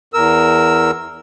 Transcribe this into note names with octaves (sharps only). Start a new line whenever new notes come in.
E2 A#4 E6